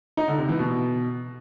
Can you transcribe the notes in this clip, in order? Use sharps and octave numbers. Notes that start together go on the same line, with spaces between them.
D#4
D3
C3
E3
B2